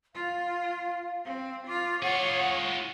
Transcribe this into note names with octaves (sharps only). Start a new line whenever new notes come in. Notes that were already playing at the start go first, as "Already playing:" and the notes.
F4 F5
C4
F4 D6
F4 G#4 C#5 F#5